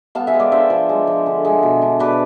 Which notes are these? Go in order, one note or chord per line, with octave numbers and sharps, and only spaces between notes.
B3 F5 A5
E5 G#5
G#3
D5 F5
D4 C5 E5
F3
G#3
F3
D3
G#3
B2
D4
B2 B4 D5